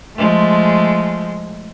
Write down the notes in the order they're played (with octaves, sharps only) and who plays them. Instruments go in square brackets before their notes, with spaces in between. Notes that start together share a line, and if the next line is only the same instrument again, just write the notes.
[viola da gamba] F3 G#3 A3